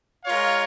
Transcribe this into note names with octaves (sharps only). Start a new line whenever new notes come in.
G#3 F4 A#4 C#5 F5